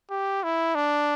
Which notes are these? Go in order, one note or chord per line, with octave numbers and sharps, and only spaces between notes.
G4
E4
D4